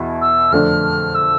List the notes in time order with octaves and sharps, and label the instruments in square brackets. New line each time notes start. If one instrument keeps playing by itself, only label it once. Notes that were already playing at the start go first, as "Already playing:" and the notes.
Already playing: [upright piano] E2 B2 E4
[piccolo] E6
[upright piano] F2 D3 A3 D4 [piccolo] F6
[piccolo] E6